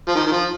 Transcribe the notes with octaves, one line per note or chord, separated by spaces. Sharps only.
F3
D#3
D#3
F3